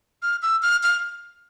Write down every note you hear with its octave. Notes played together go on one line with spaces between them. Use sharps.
F6
E6
F6
F6